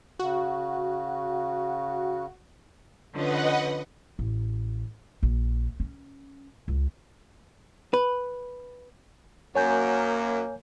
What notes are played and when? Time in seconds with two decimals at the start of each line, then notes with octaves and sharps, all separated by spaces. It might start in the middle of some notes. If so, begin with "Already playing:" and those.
0.19 C#3 F#4
3.13 D3 F3 C#4 B4 D#5 F#5
4.19 A1
5.23 A#1
5.80 C#4
6.68 C#2
7.94 B4
9.55 F#2 A#3 C#5 G#5 G6